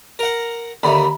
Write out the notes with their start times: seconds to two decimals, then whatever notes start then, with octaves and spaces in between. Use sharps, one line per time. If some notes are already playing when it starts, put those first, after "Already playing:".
0.19 A#4 F#5
0.83 D#2 D3 E5 A#5 B5